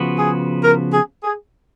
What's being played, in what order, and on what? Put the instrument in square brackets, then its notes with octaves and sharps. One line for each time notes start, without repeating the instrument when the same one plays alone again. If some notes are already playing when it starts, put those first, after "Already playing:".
Already playing: [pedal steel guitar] C#3 F3 B3 F#4 B4
[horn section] G#4
A#4
G#4
G#4